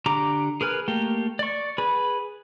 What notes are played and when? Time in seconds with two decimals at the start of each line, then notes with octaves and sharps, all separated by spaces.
0.06 D3 G4 A#5 D6
0.61 G#4 A#4 B4 G#5 F6
0.88 A3 A#3 G4
1.39 D5 C#6
1.78 G#4 B4